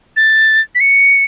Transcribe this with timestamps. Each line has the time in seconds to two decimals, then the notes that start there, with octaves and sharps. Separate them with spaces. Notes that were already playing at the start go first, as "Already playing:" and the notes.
0.16 A6
0.75 B6
0.80 C#7